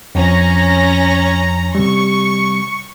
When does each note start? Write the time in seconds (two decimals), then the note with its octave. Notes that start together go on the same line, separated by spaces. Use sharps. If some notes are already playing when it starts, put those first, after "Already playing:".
0.15 F2 F3 C#4 A#5 A#6
1.75 C3 G3 C#6